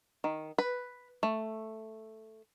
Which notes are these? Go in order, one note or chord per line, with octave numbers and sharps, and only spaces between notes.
D#3
B4
A3